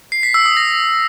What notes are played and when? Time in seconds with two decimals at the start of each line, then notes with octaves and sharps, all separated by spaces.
0.12 C7
0.23 B6
0.34 E6
0.46 D#6
0.57 A#6